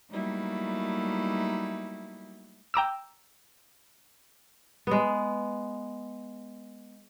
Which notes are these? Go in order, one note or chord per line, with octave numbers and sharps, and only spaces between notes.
F#3 G3 A3 A#3 D#4 E4
G5 A#5 D6 E6
G#3 B3